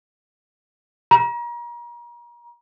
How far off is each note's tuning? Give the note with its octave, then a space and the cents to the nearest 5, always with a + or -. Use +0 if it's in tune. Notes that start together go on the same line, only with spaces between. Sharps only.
A#5 +35